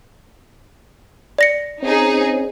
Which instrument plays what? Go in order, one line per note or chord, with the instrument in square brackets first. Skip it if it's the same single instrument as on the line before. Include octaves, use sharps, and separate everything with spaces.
[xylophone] D5 A#6 C#7
[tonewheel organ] C4 C#4 [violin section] D#4 G#4